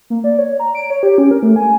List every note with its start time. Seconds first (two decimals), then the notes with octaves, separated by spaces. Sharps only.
0.10 A#3
0.24 D5
0.38 C#5
0.60 A#5
0.75 D7
0.90 C#5
1.03 G4
1.18 C#4
1.31 A#4
1.43 A3
1.56 G#5